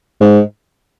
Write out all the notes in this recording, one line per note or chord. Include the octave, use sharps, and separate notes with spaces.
G#2